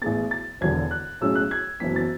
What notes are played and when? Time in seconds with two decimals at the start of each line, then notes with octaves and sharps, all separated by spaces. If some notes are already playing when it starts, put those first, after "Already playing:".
0.02 A1 A2 G#3 B3 A6
0.31 A6
0.61 E1 E2 D3 G#6
0.91 F#6
1.21 B1 A2 G#3 C#4 E6
1.35 F#6
1.51 G#6
1.80 F#1 F#2 E3 B3 B6
1.96 A6